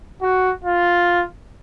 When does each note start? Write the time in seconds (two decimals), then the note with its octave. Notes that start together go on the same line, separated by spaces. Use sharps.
0.22 F#4
0.65 F4